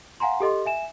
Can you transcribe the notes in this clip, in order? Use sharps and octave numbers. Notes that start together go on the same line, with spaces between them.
F5 F#5 G#5 A#5 C6
G4 A4 D#5 C6
E5 G#5 E7